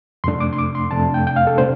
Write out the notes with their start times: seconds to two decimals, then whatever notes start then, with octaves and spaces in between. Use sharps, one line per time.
0.24 F2 C3 A3 D4 C6
0.40 D6
0.53 C6
0.58 D6
0.75 C6
0.91 F2 C3 A3 D4 A5
1.14 G5
1.27 G5
1.36 F5
1.47 A4
1.58 C3 A3 D4 C5